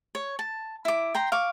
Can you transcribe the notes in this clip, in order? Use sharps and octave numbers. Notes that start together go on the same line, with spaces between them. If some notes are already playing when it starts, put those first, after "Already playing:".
C#5
A5
E4 D6
G5 A#5 C6
F5 C#6 D6